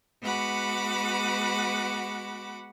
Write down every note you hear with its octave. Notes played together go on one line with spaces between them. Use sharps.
G#3 B3 F#4 F#5 B5 D6